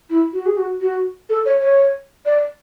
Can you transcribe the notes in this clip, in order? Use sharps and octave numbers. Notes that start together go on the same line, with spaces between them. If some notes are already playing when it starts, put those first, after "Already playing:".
E4
F#4
G#4
F#4
F#4
A4
C#5
C#5
D5